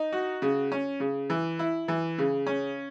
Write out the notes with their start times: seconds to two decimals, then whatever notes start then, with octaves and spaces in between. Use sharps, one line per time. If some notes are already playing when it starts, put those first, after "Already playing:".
Already playing: D#4
0.12 F#4
0.42 C#3
0.72 C#4
1.00 C#3
1.30 E3
1.59 E4
1.88 E3
2.18 C#3
2.47 C#4